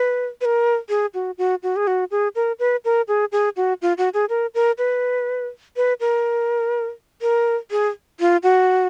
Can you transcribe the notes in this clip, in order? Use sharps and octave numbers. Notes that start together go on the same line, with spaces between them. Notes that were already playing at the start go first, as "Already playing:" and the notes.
Already playing: B4
B4
A#4
G#4
F#4
F#4
F#4
G#4
F#4
G#4
A#4
B4
A#4
G#4
G#4
F#4
F4
F#4
G#4
A#4
A#4
B4
B4
A#4
A#4
G#4
F4
F#4